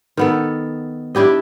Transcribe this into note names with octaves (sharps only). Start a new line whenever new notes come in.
D#3 B3 A4
D4 E4 G4 D#5